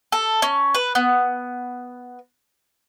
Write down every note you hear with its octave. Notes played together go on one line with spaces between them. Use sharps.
A4
C#4
B4
B3